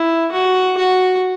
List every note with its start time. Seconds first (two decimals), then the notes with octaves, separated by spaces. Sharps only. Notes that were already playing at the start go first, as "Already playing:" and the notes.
Already playing: E4
0.33 F#4
0.77 F#4